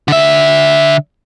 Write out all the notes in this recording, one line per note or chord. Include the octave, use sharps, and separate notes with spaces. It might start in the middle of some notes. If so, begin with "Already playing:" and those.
D3 E5